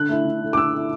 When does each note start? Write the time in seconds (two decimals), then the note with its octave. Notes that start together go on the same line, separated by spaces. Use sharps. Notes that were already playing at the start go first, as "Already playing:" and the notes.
Already playing: D3 F#6
0.09 A3 E4
0.25 D3
0.41 A3 E4
0.53 D6
0.57 D3 E6
0.73 A3 E4